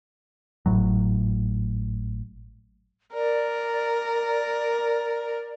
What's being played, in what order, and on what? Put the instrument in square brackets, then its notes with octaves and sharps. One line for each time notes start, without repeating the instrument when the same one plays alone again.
[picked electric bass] G#1 C#2 A2 F#3
[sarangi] A#4 [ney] D5